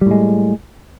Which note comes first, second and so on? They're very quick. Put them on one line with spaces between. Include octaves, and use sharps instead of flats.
G3 A2 G#3